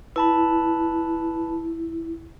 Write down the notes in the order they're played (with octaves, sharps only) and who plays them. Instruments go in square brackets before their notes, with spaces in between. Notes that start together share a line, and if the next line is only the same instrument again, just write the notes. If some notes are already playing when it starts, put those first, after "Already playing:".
[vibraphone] E4 [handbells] B4 A5 B5